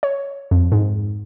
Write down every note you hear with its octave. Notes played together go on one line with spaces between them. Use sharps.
C#5
F2
G#2